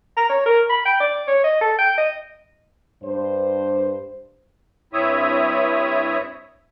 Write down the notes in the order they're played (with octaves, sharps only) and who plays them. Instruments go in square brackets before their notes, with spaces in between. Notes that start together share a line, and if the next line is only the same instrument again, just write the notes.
[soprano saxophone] A#5
C#5
A#4
B5
G5
D5
C#5
D#5
A4
G5
D#5
[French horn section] G2 C5
[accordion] G2 C4 E4 C#5 E5 D#6